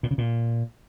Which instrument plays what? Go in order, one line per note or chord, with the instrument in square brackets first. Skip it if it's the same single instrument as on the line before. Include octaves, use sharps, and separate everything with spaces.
[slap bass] A#2
C#3
A#2